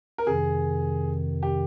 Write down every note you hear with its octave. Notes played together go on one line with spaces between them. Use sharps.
A#4
F2 C3 D#3 G#4
G4